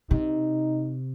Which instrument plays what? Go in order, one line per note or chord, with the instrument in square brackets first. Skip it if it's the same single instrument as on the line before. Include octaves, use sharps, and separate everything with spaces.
[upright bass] C3 [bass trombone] D#4